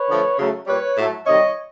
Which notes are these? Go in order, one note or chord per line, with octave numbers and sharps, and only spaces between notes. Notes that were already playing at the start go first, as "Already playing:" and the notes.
Already playing: B4 C#5
D3 F3 A3
C#3 F#3 A3
A#2 G3 B4 C#5
A2 F#3 A3
C3 D#3 G3 C#5 D#5